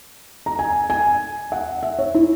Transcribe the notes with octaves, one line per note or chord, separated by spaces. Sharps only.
A#5
G#5
G#5
F#5
E5
C#5
E4